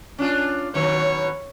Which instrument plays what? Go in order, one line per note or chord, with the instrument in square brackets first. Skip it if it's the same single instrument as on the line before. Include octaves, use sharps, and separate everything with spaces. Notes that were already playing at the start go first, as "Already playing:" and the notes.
[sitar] C#4 D4 F4
[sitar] B2 D#3 F#3 [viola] C#5